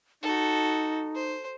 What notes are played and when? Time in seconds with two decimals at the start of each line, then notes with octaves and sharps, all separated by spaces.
0.23 D#4 F#4 A4
1.15 C5